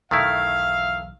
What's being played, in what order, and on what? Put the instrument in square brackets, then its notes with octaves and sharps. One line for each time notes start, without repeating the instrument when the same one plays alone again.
[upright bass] B1 E2 [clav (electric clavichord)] D#3 A3 E4 [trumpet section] E5 F5